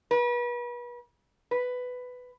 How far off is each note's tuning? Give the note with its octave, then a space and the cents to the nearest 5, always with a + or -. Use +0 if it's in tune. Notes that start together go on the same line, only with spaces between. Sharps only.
B4 -35
B4 +10